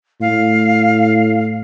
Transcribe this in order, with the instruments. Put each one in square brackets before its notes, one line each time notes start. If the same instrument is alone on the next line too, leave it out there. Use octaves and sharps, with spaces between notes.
[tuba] A2 [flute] F5